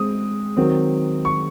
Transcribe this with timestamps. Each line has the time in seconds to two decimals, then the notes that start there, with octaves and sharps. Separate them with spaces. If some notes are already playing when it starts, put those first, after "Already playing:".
Already playing: G#3 C4 D#6
0.57 D#3 F#3 C4
1.25 C#6